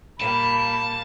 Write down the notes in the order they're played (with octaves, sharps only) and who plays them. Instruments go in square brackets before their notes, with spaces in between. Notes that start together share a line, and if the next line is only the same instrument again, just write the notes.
[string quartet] A#2 G3 A#3 [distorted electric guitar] A5 [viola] B5